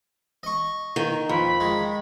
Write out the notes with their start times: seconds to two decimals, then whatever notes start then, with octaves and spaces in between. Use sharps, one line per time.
0.43 D#5 C#6
0.96 D#3
1.29 F2 B5
1.60 D#3 G#3